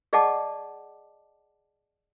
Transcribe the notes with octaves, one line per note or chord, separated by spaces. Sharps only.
G#4 D5 D#5 F#5 A5 D6